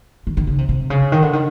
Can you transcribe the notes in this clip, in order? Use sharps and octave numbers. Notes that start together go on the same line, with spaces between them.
D#3
D#3
C#3
C3
C3
C#3
D#3
D3
D#3